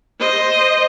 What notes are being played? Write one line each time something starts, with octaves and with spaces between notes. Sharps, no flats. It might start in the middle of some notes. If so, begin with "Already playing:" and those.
C5 D#5